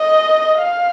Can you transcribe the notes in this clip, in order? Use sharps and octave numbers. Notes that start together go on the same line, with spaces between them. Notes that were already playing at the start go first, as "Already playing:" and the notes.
Already playing: D#5
F5